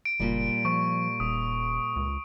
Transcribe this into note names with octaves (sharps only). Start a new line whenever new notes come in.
D7
F#1 A#2 G3
F3 C#6
D#1 D#6
C#2